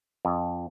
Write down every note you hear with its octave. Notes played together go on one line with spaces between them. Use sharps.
F2